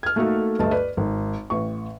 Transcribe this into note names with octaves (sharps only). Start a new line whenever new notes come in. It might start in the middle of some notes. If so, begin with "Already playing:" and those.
F6 G#6
A3 A#3 D#4 F#4 A4
D2 G2 A3 D#5 A5
B4 D5
G#1
A1 C#6